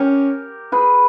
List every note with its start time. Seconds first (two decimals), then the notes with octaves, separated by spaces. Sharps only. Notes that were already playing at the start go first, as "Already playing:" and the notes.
Already playing: C#4 G4 A#4
0.72 G#4 B4